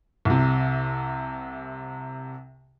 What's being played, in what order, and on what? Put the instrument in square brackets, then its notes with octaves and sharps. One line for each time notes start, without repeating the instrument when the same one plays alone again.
[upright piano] C2 C3